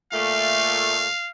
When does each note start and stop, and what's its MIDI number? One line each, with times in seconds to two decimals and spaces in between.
0.13 1.06 46
0.13 1.06 57
0.13 1.30 77